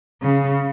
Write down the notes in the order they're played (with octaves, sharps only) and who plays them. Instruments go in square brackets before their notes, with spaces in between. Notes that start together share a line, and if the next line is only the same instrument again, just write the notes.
[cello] C#3